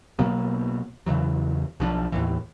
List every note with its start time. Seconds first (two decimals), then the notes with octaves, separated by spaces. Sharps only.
0.19 B2 F#3 A#3 B3
1.06 E2 C#3 E3 F#3
1.80 B1 F3 D4
2.12 D#2 A2 E3